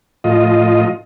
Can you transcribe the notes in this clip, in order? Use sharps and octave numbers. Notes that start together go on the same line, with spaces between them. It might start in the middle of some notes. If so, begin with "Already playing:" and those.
A2 F3 F4 D#5